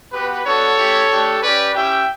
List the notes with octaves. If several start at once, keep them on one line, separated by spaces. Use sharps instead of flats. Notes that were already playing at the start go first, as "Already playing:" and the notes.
B3 F#4 G4 B4
B3 D4 F#4 A4 C#5
A3 C#4 E4 G4
A3 D4 G4
C#4 G4 B4 D5
C#4 E4 G4 E5 G5